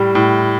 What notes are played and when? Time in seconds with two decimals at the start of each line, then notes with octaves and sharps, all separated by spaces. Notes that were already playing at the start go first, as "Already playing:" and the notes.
Already playing: A2 G3
0.15 A2